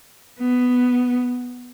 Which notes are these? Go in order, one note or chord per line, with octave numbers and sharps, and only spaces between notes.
B3